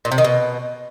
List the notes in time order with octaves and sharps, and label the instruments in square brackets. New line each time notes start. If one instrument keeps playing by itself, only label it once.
[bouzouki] A#2
C3
D#3
B2